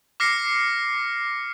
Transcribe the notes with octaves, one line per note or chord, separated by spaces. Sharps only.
D6 F6 A#6 C7 C#7